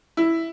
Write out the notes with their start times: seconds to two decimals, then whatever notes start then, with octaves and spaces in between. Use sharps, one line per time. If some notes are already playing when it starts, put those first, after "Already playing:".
0.17 E4